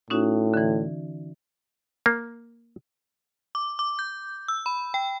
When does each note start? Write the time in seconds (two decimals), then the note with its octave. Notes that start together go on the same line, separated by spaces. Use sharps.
0.10 A2 C#4 D#4 F#4
0.54 D3 E3
2.06 A#3
3.55 D6
3.79 D6
3.99 G6
4.48 E6
4.66 B5
4.94 G5